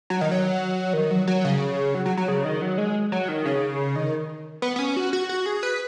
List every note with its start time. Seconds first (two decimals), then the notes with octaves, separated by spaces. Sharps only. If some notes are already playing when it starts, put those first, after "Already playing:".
0.10 F#3
0.21 D#3
0.31 F#3
0.93 D#3
1.11 F#3
1.27 F#3
1.45 C#3
1.94 F#3
2.06 F#3
2.17 F#3
2.28 C#3
2.45 D#3
2.62 F#3
2.78 G#3
3.12 F#3
3.28 D#3
3.45 C#3
3.96 D#3
4.62 B3
4.76 B3
4.79 C#4
4.97 F#4
5.13 F#4
5.29 F#4
5.46 G#4
5.63 B4